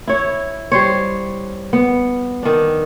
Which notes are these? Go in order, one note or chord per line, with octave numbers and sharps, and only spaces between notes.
E4 C#5
G3 C5 C#5
B3
D#3 D4